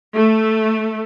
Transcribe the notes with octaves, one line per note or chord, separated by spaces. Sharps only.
A3